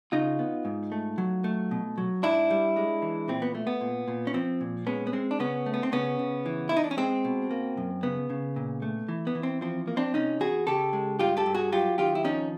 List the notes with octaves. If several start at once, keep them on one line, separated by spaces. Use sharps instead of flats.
C#3 D#4 F4
B3
G#2
A3
F#3
A3
B2
F#3
G#2 D4 E4
G3
G#3
E3
A#2 C4
B3
A3
B3
A#2
A#2
C#4
F3 C4
A#2
G#3 B3 C#4
B3
G#3 C4
D4
C#3 B3 C#4
A3
B3
C4
C#3 B3 C#4
C#3
E3
B3 E4
D#4
D4
C#4
G#3 C4
B2
A#3
F#2
C#3 B3
C#3
A#2
A3
E3
B3
E3
C4
F3 C4
A#3
C4 D4
C3 C#4 D#4
E2 F#4 G#4
C#3 G4 A4
G#3
G2 F4 G4
G4 A4
G2
F#4 G#4
F#3 F4 G4
D#3 F4 G4
E4
F3 C#4 D#4